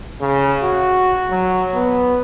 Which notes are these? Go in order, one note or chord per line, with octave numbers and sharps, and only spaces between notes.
C#3
F#4
F#3
B3